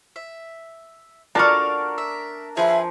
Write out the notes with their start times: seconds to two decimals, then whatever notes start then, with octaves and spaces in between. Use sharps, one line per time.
0.16 E5
1.35 D4 F4 F#4 A#4 F5 A5 C#6
1.98 E5
2.57 F3 G#4 B4 E5